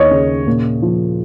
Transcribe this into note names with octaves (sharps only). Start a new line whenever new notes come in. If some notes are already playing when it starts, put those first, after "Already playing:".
Already playing: D#2 C#5 D#5
C#3
A#2
F3